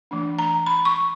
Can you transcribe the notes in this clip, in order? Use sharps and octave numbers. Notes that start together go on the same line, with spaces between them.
E3 A3 D4
A#5
B5
C#6